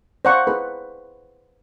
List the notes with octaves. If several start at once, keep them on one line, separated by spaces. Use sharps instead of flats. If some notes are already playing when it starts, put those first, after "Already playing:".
C5 D5 F5 F#5 A#5 C#6
G#4 B4